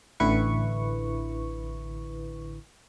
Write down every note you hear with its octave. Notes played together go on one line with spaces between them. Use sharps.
A1 D3 E4 B4 C#6